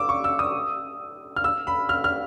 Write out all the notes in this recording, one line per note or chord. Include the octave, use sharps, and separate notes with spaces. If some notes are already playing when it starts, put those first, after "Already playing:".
Already playing: D6 E6
C#6
E6
D#6
F6
E6
B5
F6
F6